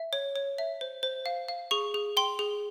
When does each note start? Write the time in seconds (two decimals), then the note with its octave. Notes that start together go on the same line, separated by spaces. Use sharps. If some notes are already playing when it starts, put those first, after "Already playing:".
Already playing: E5
0.13 C#5
0.36 C#5
0.58 E5
0.81 C5
1.03 C5
1.26 F5
1.48 F5
1.71 G#4 C#6
1.94 G#4
2.17 G5 C6
2.39 G#4